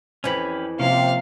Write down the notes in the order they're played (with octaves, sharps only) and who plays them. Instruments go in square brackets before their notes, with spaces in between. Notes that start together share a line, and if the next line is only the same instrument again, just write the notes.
[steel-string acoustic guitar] F2 E3 [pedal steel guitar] C#4 G4 B5
[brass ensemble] C3 [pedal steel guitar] F3 A#3 C#4 [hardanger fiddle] F5